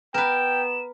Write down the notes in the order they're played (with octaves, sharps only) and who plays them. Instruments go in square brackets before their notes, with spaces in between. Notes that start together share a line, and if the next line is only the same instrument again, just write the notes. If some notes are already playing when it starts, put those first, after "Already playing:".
[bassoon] B3 [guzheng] A#4 B4 [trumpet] G5 [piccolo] E7